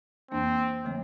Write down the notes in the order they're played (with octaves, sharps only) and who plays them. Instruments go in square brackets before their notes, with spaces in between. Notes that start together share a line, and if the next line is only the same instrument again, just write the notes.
[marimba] F2 E3 A#3 D4 [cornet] C4
[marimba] D3 F3 A3 C4